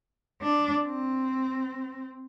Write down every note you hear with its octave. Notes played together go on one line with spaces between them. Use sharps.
D4
C4